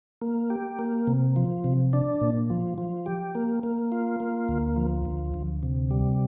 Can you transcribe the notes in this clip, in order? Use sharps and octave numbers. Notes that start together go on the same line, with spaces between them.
A#3
G4
A#3
C3
F3
C3
D4
A#2
F3
F3
G4
A#3
A#3
F4
A#3
D2
F3
D2
D2
C3
G3